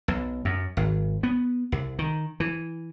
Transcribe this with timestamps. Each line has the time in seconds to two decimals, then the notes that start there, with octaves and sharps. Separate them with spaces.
0.08 B1
0.45 F#2
0.77 G#1
1.23 B3
1.72 C2
1.99 D#3
2.40 E3